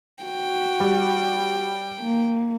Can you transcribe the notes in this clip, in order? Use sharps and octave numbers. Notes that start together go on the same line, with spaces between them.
F#4 G5
G3
A#3